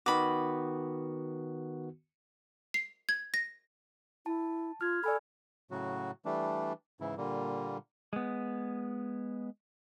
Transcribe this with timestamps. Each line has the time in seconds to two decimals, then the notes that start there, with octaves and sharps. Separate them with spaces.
0.06 D#3 B3 F#4 B5 D6
2.74 C7
3.09 G#6
3.34 A#6
4.26 E4 A5
4.81 F4 F6 G#6
5.04 A4 D5 G#5 B5
5.71 A2 C#3 F#3 F#4
6.25 E3 G3 A3 D4
7.01 G#2 C#3 E3 E4
7.17 A#2 D3 G3 A#3
8.13 G#3 B3